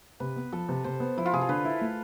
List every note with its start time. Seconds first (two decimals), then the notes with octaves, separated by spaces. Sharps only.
0.20 C3 B4
0.36 B3
0.52 F3 A4
0.69 C3
0.84 C3 C5
1.00 B3
1.17 F3 E4
1.26 F4
1.33 C3 G#4
1.41 A4
1.49 D3 B4
1.65 E4
1.81 A3